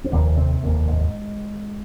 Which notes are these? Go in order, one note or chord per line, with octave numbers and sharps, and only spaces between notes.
C4
F1 D#2 A#2 A#3
C3 C4
F1 D#2 A#2 A#3
G#2 G#3